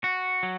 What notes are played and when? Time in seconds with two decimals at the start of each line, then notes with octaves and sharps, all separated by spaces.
0.04 F#4
0.43 F#3